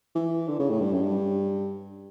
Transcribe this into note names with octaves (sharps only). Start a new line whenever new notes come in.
E3
D3
C#3
A2
G2
F#2
G2